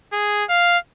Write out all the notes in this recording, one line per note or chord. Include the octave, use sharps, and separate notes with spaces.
G#4
F5